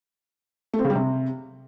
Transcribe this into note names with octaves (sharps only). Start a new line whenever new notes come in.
A3
C4
C#3
G3
C3